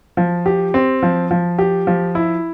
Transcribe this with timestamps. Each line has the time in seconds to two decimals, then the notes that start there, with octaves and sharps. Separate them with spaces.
0.17 F3
0.46 G4
0.74 C4
1.02 F3
1.31 F3
1.59 G4
1.87 F3
2.15 E4